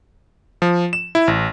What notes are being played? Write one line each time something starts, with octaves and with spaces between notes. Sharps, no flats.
F3
E7
E4
A1